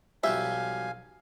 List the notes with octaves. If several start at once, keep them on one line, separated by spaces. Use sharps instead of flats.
B1 F3 G3 E5 F5 G#5